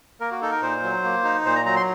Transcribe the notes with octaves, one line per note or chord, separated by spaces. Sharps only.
A#3 A#4
F#4
D#4 A4
A#4
A#2 C5
F#3
A#3
D#4
A#2 C5
A#5
F#3 A#5
C6